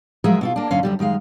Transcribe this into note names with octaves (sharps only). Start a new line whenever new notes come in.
F3 F#3 G#3 G#4 A#4 E5
B2 E4 F4
A#3 D4
F#2 D3 C#4 F5
F#2 D3 G3
F#2 D#3 G#3 F5